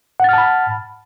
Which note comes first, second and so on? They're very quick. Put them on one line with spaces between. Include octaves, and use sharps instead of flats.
F#5 A6 F6 A5 B5